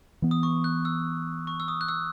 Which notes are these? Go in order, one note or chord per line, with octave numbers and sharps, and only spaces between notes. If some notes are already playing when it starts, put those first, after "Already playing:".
E3 B3
D#6
C#6
F#6
E6
C#6
E6
D#6
F#6
E6